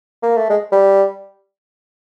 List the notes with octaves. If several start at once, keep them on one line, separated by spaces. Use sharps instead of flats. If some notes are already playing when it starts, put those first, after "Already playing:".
A#3
A3
G#3
G3